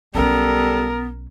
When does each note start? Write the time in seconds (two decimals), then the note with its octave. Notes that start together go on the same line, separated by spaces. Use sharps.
0.15 B1 G3 B3 C#4 A4 A#4